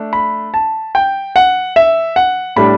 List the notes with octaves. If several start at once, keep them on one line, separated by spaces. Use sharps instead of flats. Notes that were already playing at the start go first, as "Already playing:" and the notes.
Already playing: A3 D4
B5
A5
G5
F#5
E5
F#5
A2 G3 D4 B5